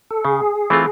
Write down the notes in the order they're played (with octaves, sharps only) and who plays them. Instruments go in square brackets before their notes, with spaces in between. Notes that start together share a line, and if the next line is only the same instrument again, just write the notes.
[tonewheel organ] A4
[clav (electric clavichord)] C#3 [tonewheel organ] G#4
[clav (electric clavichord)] E3 A3 C4 F4